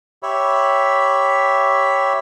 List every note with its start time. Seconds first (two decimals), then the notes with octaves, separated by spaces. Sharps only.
0.23 G4 C#5 E5 B5